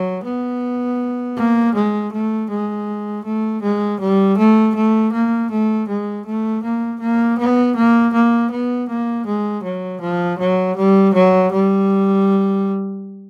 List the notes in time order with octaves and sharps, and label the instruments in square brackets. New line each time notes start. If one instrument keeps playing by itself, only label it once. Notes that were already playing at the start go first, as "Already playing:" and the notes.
Already playing: [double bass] F#3
B3
A#3
G#3
A3
G#3
A3
G#3
G3
A3
A3
A#3
A3
G#3
A3
A#3
A#3
B3
A#3
A#3
B3
A#3
G#3
F#3
F3
F#3
G3
F#3
G3